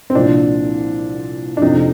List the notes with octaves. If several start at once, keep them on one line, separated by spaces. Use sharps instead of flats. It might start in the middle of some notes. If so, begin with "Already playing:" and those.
C4
C2 A#2 F3 D4
D4
F2 C3 F3 D#4